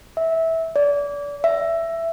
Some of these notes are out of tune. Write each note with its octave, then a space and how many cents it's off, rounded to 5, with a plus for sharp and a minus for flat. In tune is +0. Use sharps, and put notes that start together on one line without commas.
E5 -15
D5 -30
E5 +10